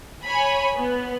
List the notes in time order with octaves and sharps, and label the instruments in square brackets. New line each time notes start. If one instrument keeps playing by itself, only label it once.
[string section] C#5 G#5 B5
B3